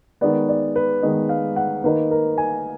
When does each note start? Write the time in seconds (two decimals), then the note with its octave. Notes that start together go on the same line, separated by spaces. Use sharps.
0.21 D#3 G#3 B3 D5
0.49 D5
0.76 B4
1.02 D#3 G#3 B3 D#5
1.29 F5
1.56 F#5
1.84 D#3 A#3 D#4 B4
2.11 A#4
2.38 G#5